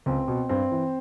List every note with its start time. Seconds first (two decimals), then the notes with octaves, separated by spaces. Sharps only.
0.06 C#2 C4
0.28 B2
0.49 G2 C4
0.71 E3